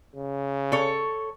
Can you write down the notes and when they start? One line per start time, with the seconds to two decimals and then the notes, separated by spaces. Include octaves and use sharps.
0.15 C#3
0.72 A4 C#5